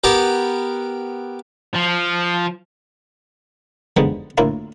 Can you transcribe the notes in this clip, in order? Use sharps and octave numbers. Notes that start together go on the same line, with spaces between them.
B3 G4 A#4
F3
D3 F3 G3 G#3 B3 D#4
D2 A2 A#3 E4 F4 A#5